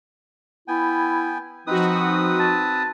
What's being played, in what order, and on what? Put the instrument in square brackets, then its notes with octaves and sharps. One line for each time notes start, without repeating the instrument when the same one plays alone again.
[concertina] B3 G5 G#5 [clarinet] E4
[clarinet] F3 [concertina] C4 B4 D#6 [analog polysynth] D#4 F#4
[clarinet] A5